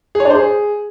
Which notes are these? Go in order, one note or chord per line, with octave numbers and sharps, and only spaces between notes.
G#4
C#5
D4
C5
G#4